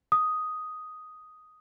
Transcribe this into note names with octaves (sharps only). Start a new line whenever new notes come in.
D#6